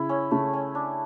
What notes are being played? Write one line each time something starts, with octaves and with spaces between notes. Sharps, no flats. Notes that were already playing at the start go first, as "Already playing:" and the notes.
Already playing: C#3 E4
C#4
C#3 A3
C#4
D4